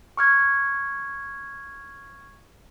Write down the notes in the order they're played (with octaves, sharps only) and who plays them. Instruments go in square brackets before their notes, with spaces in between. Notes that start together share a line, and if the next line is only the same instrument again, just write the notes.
[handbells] C#6 F6 G#6